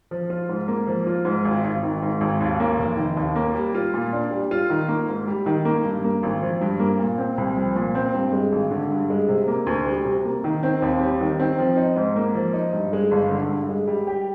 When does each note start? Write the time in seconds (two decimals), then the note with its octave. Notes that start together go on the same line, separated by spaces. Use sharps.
0.11 F3
0.30 F4
0.49 G#2
0.68 A#3
0.87 F3
1.07 F4
1.25 G#2
1.45 G#1
1.64 G#1
1.83 D#3
2.02 G#2
2.21 G#1
2.40 D#2
2.60 A#3
2.79 F1
2.97 D#3
3.17 D#2
3.36 A#3
3.54 G3
3.74 F4
3.94 A#2
4.13 D4
4.31 G3
4.51 F4
4.70 D#3
4.88 A#3
5.09 G#2
5.27 G3
5.46 D#3
5.65 A#3
5.84 G2
6.04 A#3
6.23 G#1
6.42 F3
6.61 G2
6.80 A#3
6.99 A#2
7.18 C4
7.38 C2
7.57 F3
7.76 A#2
7.95 C4
8.14 G2
8.33 G#3
8.52 G#1
8.71 D3
8.91 G2
9.10 G#3
9.28 C3
9.48 A#3
9.67 D2
9.86 G3
10.05 C3
10.25 A#3
10.44 D#3
10.63 C4
10.82 D#2
11.00 G3
11.21 D#3
11.40 C4
11.59 F3
11.77 D#4
11.96 G#2
12.16 A#3
12.35 F3
12.53 D#4
12.73 G2
12.93 G#3
13.11 G1
13.31 D3
13.49 G2
13.69 G#3
13.88 G3
14.07 G4